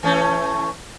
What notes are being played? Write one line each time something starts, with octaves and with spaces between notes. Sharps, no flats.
E3 A3 C#4